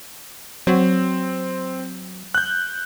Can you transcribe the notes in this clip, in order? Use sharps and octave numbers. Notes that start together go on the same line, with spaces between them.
F#3 C4
F#6 G6